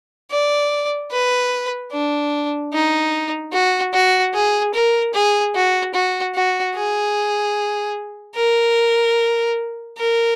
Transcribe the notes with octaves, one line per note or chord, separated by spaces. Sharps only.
D5
B4
D4
D#4
F#4
F#4
G#4
A#4
G#4
F#4
F#4
F#4
G#4
A#4
A#4